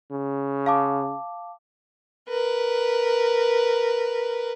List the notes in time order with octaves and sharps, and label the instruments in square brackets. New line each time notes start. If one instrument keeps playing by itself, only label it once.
[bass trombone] C#3
[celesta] F5 A5 D6
[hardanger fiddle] A#4 B4